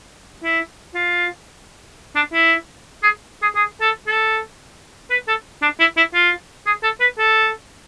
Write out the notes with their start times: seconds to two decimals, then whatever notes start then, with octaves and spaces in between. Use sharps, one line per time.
0.43 E4
0.95 F4
2.16 D4
2.33 E4
3.03 G#4
3.42 G#4
3.55 G#4
3.81 A4
4.07 A4
5.10 B4
5.28 A4
5.62 D4
5.80 E4
5.97 E4
6.14 F4
6.66 G#4
6.83 A4
7.00 B4
7.18 A4